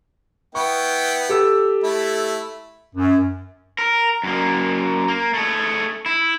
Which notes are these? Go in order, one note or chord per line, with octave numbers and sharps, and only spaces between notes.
B3 E4 G5 C#6
G4 A4 E6
A3 E4
F#2
A#4
F#2 A#3
A#3
A3 G#4
E4